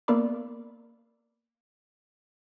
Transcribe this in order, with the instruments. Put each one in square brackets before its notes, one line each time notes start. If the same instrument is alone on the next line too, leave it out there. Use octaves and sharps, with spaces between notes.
[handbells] A#3 B3 A#4 D5 B5 D6